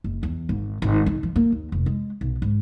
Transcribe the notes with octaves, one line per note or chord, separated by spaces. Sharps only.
F#1
E2
G#1
G#1
D#3
F3
A#3
D#2
F1
G#3
B1
G#2